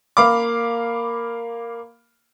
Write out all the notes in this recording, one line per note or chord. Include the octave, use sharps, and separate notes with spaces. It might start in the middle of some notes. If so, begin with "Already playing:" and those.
A#3 F5 B5 D6